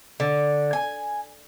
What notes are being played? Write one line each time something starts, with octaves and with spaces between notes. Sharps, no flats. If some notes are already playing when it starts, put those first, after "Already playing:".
D3
G#5